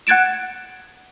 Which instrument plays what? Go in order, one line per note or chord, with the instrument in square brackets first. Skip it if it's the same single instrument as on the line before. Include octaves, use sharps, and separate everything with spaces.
[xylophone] F#5 F#6 G#6 A6 D7 E7